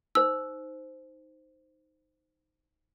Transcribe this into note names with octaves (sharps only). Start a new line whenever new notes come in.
D#4 C5 E6